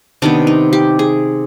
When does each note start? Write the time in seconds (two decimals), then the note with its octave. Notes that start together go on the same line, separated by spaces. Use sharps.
0.22 C3 D#3 B3 D4
0.47 D#4
0.73 G4
0.99 G#4